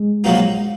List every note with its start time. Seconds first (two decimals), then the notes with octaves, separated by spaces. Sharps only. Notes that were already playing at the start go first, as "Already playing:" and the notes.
Already playing: G#3
0.24 A#1 A#2 F#3 A#3 D#4